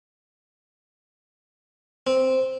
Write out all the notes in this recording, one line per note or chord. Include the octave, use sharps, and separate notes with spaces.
C4